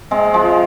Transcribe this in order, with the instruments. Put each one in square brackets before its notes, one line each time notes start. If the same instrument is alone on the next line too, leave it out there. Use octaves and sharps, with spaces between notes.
[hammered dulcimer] C3 G#3
F3 G#3